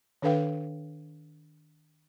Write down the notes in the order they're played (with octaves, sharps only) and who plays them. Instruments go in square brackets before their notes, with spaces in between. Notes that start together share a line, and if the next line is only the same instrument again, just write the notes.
[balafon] D#3 D4 A4 B4 F5 G5